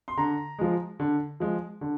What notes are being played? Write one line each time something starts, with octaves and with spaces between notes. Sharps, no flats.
C6
D3 A#5
F3 G#3
D3
F3 G#3
D3